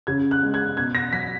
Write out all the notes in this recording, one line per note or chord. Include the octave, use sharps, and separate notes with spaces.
C#3 G#6
F#6
G#3
G#6
B2 G#6
A#6
F#3 B6